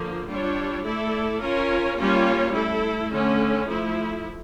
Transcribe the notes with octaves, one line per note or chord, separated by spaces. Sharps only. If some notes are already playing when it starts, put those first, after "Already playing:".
Already playing: D3 F3 A#3
G3 D4 F4 C#5
A3 E4 A4 D5
C#4 F4 A#4 C#5
G3 A#3 C#4 F4 C#5
A3 E4 A4
D3 A3 C#4
F3 A3 E4